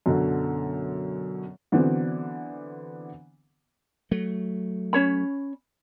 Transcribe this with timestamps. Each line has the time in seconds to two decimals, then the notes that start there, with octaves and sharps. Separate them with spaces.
0.06 F#2 B2 D3
1.72 D3 E3 F#3 B3 C4
4.11 F#3 A3
4.93 C#4 C#5 B5